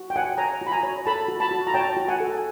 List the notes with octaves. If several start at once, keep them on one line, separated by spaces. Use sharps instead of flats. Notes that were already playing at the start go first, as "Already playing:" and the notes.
Already playing: F#4
G5
C#5 F#5 G#5
C#5 G#5 A#5
F#4
B5
G#5 A#5
C#5
A4 A5 B5
F#4
A5 B5
F#4
A#5
C#5 G5 A5
F#4
F#5 G#5
A4
G#5